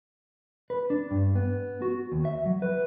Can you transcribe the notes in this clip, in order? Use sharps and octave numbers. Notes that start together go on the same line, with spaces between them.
B4
D4
G2
B3
F#4
D#2
E5
F#3
B4